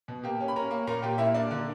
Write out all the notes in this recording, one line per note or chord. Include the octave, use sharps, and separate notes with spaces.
B2
A#3 G4 G5
C#4
B5
C#4 A#4 A#5
A#3
A#2 A#4 A#5
A#2 G4 G5
A#3 E4 E5
A#3 D4 D5
D3